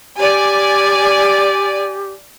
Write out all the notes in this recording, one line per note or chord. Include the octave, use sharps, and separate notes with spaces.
G4 D5 G#5